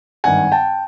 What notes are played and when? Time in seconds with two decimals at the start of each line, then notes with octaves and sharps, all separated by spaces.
0.24 G#1 G2 D#3 F#5 G#5
0.52 G5 A5